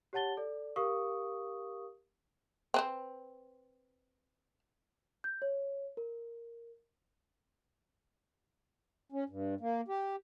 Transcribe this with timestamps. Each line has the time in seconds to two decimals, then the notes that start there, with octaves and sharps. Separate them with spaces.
0.13 G4 C#5 F#5 A5 A6 G7
0.37 A4 D5
0.76 G4 A#4 F5 C#6 D#6
2.74 C4 B4 C5
5.24 G6
5.42 C#5
5.97 A#4
9.12 C#4
9.29 G2
9.61 A#3
9.88 G4